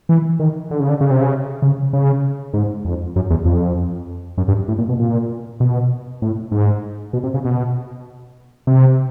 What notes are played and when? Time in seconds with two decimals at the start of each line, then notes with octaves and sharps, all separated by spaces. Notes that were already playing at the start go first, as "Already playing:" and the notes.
0.09 E3
0.39 D#3
0.71 D3
0.80 C#3
0.89 D3
1.01 C#3
1.11 C3
1.21 C#3
1.62 C#3
1.93 C#3
2.53 G#2
2.85 F2
3.16 F#2
3.30 E2
3.45 F2
4.38 F#2
4.48 G2
4.68 A2
4.78 A#2
4.89 B2
4.99 A#2
5.60 B2
6.22 A2
6.52 G#2
7.13 B2
7.24 C3
7.34 C#3
7.45 B2
8.67 C3